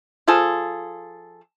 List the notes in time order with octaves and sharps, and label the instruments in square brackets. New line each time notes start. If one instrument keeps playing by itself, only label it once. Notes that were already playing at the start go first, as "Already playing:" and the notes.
[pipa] F3 F4 G#4 A4